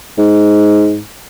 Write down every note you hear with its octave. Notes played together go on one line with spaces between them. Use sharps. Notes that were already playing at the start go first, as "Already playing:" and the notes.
G#2